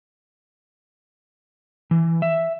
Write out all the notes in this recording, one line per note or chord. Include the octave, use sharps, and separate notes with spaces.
E3
E5